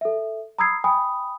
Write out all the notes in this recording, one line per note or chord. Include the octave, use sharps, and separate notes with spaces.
A4 E5
A#5 B5 D#6 E6 G#6 C7
G5 G#5 B5 D#6